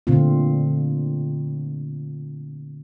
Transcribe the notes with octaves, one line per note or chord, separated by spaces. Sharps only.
A#2 D3 A3 C4 F4